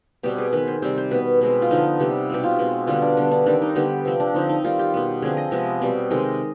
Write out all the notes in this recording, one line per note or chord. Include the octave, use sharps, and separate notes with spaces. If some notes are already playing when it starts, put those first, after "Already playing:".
B2 G3 C4 G4
G#4
D#3 B3 B4
C5
C3 G3 C4 C5
C5
B2 B3 B4
B2 G#3 C4
F4
D3 F3 B3 D#4
C3 G3 B3
B2 G3 C4 G4
F4
B2 G#3 C4
D3 G3 B3 F4
D4
D3 G3 B3
D4
D#3 G3 C4 D4
D#4
D3 G3 B3 G4
C3 F3 C4
D4
D3 F3 C4 D#4
D#4
D#3 G3 C4 F4
G4
B2 B3
D3 F3 C4 G#4
D#5
C3 F3 G#3 B3
B2 G3 C4
C3 D#3 G#3 D#5